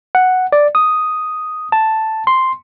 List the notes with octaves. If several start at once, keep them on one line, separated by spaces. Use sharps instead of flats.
F#5
D5
D#6
A5
C6